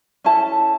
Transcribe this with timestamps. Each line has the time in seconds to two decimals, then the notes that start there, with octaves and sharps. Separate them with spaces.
0.24 C#4 E4 A4 A5